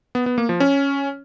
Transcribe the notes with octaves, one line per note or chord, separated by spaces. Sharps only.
B3
B3
A#3
F3
C#4